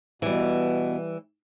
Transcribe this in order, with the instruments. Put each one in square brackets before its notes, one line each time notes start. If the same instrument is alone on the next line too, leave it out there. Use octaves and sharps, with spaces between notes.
[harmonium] B2 [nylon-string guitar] E3 G3